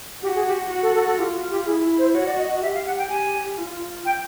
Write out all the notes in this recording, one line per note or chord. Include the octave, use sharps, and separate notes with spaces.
F#4 G4
G#4
G4
F#4
A4
A4
A4
F4 G4
F#4
G4
E4 G#4
C5
F#4 C#5
D5
D#5
D#5
G4 E5
F5
F#5
G5
G4 G#5
F4
G5